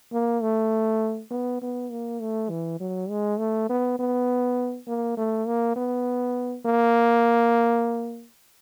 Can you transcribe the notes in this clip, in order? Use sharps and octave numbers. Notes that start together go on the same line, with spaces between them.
A#3
A3
B3
B3
A#3
A3
E3
F#3
G#3
A3
B3
B3
A#3
A3
A#3
B3
A#3